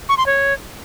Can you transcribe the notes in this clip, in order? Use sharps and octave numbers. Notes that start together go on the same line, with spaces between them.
C#6
C6
C#5